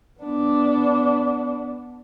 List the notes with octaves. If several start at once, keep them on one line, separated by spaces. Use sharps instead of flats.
B3 D4